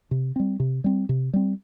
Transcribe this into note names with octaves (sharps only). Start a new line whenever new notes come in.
C3
G3 C4
C3
G3 C4
C3
G3 C4